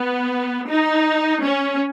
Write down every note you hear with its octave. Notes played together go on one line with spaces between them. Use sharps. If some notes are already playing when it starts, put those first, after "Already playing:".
Already playing: B3
D#4
C#4